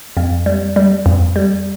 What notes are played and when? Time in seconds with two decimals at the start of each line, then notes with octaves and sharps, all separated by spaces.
0.17 F2
0.46 G3
0.76 G3
1.06 F2
1.36 G3